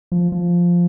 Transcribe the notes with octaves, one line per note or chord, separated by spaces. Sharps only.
F3
F3